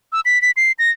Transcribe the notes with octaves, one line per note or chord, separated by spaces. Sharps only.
E6
B6
B6
C7
A#6